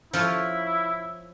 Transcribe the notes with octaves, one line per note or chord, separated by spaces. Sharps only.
F3 E4 F4 C#5